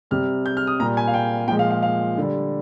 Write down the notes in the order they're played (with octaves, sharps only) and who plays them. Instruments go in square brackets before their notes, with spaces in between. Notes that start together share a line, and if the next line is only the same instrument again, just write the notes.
[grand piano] C3 G3 F6
G6
F6
D#6
A#2 G3 A#5
G#5
F5
G5
A#2 G5
F3 G#3
F5
F5
F5
D3 G3